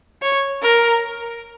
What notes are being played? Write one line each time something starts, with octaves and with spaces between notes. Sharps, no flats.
C#5
A#4